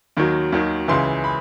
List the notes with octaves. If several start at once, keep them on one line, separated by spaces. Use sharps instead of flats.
D#2 D#3 F#3
D#2 D#3 F#3
C#2 C#3 E3 C6
B5